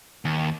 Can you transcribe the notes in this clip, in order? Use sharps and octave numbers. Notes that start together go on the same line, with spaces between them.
D#2